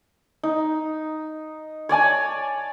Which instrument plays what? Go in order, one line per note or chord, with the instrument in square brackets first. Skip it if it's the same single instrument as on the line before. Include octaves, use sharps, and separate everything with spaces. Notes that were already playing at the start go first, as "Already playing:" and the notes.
[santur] D#4
C#5 D5 G#5 A5